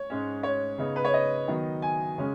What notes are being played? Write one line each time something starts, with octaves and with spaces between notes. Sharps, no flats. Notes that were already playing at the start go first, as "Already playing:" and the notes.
Already playing: C#5
G#2 G#3 C#4
C#5
C#3 B3 D#4
B4
C#5
D#5
D#3 F#3 B3 D#4
G#5
C#3 G#3 C#4